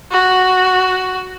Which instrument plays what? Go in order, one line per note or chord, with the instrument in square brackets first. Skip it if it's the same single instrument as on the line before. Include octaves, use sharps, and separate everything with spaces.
[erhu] F#4